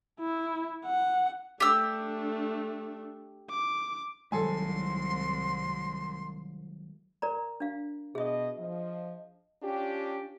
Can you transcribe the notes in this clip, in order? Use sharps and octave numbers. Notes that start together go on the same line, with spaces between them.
E4
F#5
A3 D4 G4 E6
D6
C2 D#3 F#3 G#3 A4 G#5 C6
A#4 D5 A#5
D4 F5
B2 G#4 D#5 E5
F3 D#5
C#4 D4 F4 G4